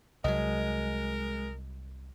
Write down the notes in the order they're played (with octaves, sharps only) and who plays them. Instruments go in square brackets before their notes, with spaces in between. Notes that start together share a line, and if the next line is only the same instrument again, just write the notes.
[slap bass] C2 F#3 [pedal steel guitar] G#3 [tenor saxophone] A#4 [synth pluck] D#5